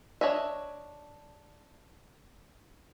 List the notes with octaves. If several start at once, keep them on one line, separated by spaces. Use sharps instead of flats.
D4 C#5 D#5 E5